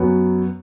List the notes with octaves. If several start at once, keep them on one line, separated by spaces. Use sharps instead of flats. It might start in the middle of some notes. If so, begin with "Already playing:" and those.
Already playing: F#2 F#3 B3